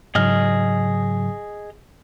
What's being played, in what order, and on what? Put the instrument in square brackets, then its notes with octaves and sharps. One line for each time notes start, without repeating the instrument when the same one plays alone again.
[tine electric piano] G#2 C#3 F#3 [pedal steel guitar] G#4 D#5 F6